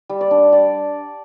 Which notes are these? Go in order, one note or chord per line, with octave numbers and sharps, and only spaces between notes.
G3
D5
D4
G3 D5